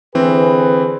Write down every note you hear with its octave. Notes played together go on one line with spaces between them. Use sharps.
D3 E3 C4 G#4 B4